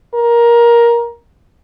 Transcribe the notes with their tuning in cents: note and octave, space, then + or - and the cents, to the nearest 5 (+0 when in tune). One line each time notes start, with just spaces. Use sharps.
A#4 +15